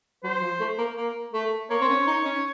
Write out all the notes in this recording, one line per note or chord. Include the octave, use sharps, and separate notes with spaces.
F#3 C5
F3
A3
A#3
A#3
A3
A#3 C#5
C4
C#4
D#4
C#4